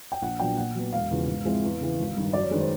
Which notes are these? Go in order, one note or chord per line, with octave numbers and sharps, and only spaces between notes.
G5
A#1 F#5
A#2 F#3 B3 D4 G5
A#2 F#5
F#3 B3
E1 F5
E2 C#3 F3
G#2
F3 G#3 C4 E4
E2
C#3 E3
G#1
G2 D#3
F#2 D5
C#5
D#3 G#3 B4
C5